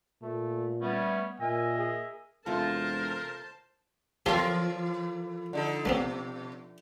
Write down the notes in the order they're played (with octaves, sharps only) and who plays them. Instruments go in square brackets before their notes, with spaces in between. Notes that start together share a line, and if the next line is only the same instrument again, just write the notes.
[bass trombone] A#2 [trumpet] A3
[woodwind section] G3 A3 C#4 [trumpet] B3
[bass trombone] A#2 [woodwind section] A#4 D#5 E5 [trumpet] G#5
[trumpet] G#4
[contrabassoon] E1 [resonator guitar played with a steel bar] C3 F4 A4 [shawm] A#4 [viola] C5 A5
[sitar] E3 A4 A#4 [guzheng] F3 F4 [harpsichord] G4
[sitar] D3 D#4 A4
[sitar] B2 [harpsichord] A3 B3 C4